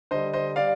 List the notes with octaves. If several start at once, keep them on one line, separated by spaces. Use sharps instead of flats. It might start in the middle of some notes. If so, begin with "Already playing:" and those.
D3 G3 C5 D#5
C5 D#5
G3 D5 F5